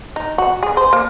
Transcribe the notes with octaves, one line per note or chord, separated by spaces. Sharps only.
D#4
F#4
G#4
C5
A#3